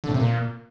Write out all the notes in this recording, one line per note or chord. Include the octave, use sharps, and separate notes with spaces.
D3
A2
C3
A#2